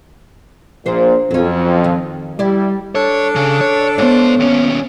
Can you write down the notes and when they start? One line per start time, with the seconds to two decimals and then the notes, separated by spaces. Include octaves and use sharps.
0.86 A#1 A#2 D4 C5
1.31 F2 F#3 C#4
1.84 D#3
2.39 G3 E4 D5
2.95 D4 A4 C#5
3.36 C#3
3.61 C#5
3.98 G#2 B3 C5 C#5
4.40 D#2 C#4